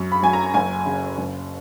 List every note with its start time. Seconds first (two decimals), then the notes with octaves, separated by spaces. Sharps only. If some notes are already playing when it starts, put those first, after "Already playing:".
Already playing: F#2
0.12 B5
0.23 F#3 G#5
0.33 A#5
0.54 F#1 G#5
0.86 C#3
1.18 F#1